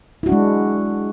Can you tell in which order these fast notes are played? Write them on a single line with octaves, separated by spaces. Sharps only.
E4 F#4 D4 G#3